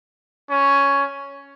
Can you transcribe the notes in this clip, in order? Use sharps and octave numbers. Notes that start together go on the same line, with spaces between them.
C#4